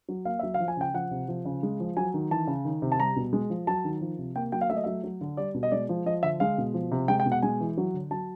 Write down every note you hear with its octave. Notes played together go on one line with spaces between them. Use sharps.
F#3
A#3 F5
F#3 E5
F5
F3
G#5
C#3 G5
F3 F#5
C3
F3
C#3
G#3
F3
F#3 G#5
D#3
E3 A5
C#3
D#3
C3
A5
G3 A#5
B2
G#3
F3
F#3 A5
D#3
F3
C3
A#3 G5
F#3 G5
F5
A3 E5
D#5
F#3 E5
F#3
D3
G3 D5
B2
D#5
G#3 D5
F3
F3 D#5
D3 E5
G#3 F5
B2
F3
C3
G#3 G5
G5
B2
F#5
G#3 G#5
E3
F#3
D3
F#3 A5